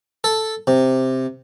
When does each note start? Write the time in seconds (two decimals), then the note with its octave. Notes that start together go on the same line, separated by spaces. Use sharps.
0.24 A4
0.67 C3